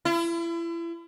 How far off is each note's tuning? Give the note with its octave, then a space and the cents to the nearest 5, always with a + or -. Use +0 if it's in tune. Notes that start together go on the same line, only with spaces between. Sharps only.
E4 +35